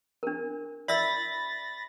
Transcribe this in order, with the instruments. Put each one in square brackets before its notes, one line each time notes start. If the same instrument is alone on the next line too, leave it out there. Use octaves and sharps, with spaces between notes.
[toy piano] D4 A#4
[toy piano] D5 E5 E6 [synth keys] B5 A6 A#6